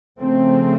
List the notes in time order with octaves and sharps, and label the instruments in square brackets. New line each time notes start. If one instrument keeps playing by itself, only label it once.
[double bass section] C#3 F3 A3 C4